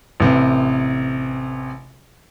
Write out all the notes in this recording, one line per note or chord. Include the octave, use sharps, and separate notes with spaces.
A1 C3